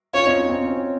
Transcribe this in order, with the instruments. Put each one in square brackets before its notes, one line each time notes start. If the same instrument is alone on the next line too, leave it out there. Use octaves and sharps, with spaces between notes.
[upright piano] C#4 F4 [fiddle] C#5
[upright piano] C4 D#4
C#4
C4
C#4